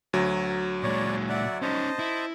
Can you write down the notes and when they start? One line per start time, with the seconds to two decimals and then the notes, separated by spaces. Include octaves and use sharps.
0.13 D2 F#3
0.83 A#2 G#3 C#5 D5
1.29 D5 E5 F#5
1.62 C#4 D#4 C5 D#5 A5
1.99 E4